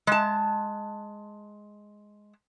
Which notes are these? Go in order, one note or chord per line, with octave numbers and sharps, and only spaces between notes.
G#3 A5